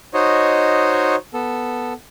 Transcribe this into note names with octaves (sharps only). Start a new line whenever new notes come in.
D#4 F#4 C5 C#5 D#5
B3 A4